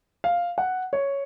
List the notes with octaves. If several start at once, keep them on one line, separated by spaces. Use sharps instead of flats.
F5
F#5
C#5